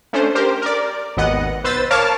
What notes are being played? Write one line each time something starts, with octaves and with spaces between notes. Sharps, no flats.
A3 C#4 D4 C5
G4 A#4 C5
A#4 D5
G#1 D#2 B3 D#5 F#5
B1 B4 C5 E6 A6
A#4 C#5 F5 A5 D6 F6